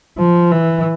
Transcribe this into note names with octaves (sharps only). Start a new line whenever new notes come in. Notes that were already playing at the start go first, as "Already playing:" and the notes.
F3
E3